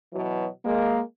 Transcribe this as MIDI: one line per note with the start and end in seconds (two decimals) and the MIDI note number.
0.13 0.47 47
0.13 0.47 52
0.13 0.47 54
0.64 0.99 56
0.64 0.99 58